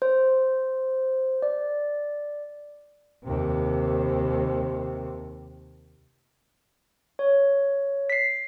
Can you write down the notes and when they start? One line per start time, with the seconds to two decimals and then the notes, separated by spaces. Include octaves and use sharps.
0.02 C5
1.42 D5
3.24 D#2 C3
7.19 C#5
8.10 B6 C7